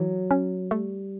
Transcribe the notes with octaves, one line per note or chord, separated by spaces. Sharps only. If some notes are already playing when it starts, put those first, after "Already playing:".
Already playing: E3 F#3
C#4
G3 A3